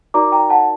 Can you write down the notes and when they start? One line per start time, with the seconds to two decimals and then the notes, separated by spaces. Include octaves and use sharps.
0.14 D#4 F#4 A#4 D5 A#5 D6
0.32 G5 A#5
0.50 F#5 A5